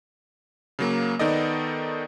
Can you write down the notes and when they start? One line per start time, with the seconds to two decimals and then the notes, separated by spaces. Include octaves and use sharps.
0.79 C#3 F#3 A#3
1.19 D#3 B3 D#4 A4 D5 D#5